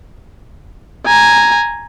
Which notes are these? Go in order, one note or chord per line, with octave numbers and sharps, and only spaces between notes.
G#5 A#5